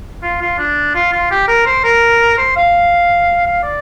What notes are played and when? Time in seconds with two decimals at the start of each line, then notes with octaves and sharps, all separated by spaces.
0.23 F4
0.42 F4
0.59 D4
0.95 F4
1.13 F4
1.31 G4
1.48 A#4
1.66 C5
1.84 A#4
2.38 C5
2.57 F5
3.46 F5
3.63 D5